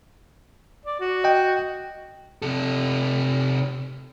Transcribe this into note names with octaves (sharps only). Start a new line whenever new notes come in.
D5
F#4
D#5 G5
C3 A4